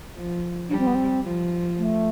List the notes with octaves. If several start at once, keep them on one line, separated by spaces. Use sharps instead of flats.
F3
G3 D4
C4
B3
C4
F3
A3